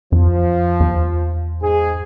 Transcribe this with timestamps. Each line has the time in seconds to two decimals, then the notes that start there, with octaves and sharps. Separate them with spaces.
0.12 F2 F3
0.80 E2
1.62 G#2 G#4